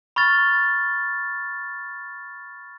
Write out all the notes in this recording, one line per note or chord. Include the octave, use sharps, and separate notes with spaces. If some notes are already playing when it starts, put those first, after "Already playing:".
B5 C#6 F6 A6